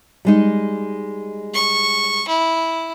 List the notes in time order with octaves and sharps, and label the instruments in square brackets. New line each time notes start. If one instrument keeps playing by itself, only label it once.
[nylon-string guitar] G3 G#3 D#4
[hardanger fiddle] C#6
E4